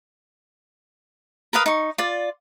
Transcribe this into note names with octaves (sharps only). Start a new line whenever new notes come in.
A#4 B4 F5 D#6
D#4 C#6
F4 D5